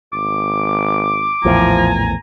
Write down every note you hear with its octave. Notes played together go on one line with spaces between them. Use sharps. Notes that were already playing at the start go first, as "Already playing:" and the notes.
G#1 D6
A#1 E2 A2 F3 G#5 A#5